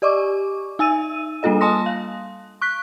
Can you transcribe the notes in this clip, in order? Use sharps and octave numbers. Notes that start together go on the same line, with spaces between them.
G4 D5 D#5 C#6 D6
D#4 G#5 E6 D#7
G3 A#3 D4 F4 A4 D#5
D#5 G#5 A5 C6 D#6 A#6
F5
C#6 F#6 B6